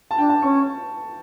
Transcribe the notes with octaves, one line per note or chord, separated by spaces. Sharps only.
A5
D4 G5
A5
C#4 C#6